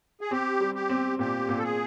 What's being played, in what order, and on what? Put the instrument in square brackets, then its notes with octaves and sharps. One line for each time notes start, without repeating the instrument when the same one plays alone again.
[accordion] G#4
[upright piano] C4 [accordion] G4
[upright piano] G3
[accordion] G4
[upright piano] C4
[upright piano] A#2 [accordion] G4
[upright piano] A#2
[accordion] A4
G#4